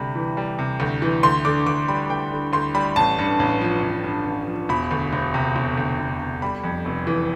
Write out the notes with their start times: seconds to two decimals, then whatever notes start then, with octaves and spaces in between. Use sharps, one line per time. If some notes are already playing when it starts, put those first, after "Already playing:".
Already playing: D2 C3 G3 B5
0.15 E3
0.37 G3
0.59 C3
0.80 D2
1.02 E3
1.23 D2 C6
1.45 D3 D6
1.66 D2 D6
1.88 G3 B5
2.10 D2 G5
2.32 D3
2.53 D2 C6
2.75 G3 B5
2.96 A1 A5
3.18 G2
3.39 A1
3.61 F3
3.83 A1
4.04 G2
4.26 A1
4.48 F3
4.69 E1 B5
4.91 D2
5.13 E1
5.34 C3
5.56 E1
5.77 D2
5.99 E1
6.20 C3
6.42 G3 B5
6.64 F2
6.85 F1
7.07 E3